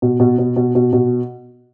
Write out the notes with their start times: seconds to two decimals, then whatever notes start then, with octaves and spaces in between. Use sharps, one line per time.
0.02 B2
0.20 B2
0.38 B2
0.56 B2
0.75 B2
0.93 B2